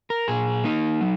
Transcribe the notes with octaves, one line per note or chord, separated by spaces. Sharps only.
A#4
A#2 G#4
A#3 D#4
F#3